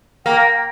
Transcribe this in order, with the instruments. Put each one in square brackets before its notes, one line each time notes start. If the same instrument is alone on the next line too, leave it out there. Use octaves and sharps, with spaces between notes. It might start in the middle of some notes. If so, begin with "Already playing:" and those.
[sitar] A#3 [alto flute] G5